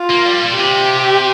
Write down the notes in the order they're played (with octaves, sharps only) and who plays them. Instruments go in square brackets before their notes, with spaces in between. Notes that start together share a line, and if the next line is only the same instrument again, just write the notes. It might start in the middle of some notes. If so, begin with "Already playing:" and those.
Already playing: [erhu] F4
[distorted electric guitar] A#3
G3
A#2
[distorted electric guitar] C3 [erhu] G4